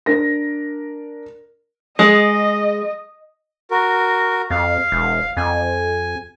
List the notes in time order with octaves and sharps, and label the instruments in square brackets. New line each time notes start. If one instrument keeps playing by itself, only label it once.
[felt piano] D4 A#4 A#6
[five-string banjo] G#3 [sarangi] D#5
[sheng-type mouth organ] F#4 A#4
[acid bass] F2 [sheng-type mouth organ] F5
[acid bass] E1
[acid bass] F2 [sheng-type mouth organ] G#5